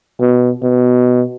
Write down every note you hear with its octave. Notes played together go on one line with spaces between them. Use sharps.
B2
B2